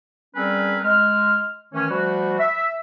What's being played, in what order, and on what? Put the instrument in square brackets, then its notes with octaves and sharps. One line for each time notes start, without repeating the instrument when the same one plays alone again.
[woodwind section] G3 C4 C#4 G#4 A#4 B4
G#3 F6
D#3 E3 A3 C#4
F3 G3 A3 F#4
E5